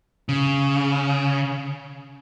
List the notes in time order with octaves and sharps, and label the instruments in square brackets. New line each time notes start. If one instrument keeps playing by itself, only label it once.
[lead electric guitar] C#3